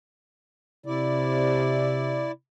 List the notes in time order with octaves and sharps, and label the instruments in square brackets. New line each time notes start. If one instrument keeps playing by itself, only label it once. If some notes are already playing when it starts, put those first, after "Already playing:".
[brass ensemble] C3 [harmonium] E4 D5